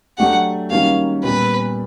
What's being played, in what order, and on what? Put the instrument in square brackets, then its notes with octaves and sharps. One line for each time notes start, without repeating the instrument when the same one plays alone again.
[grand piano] F#3 A3 D4 G4 [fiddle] F#5
[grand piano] D#3 G3 A#3 C#4 F#4 [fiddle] F5
[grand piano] A#2 G3 B3 [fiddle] B4